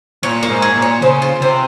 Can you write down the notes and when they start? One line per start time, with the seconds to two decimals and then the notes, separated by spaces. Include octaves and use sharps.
0.23 A#2 C#5
0.43 A#3
0.49 G#2
0.62 G#4
0.76 A#2
0.82 C#5
1.02 C#3 C5
1.22 F4
1.41 C3 C5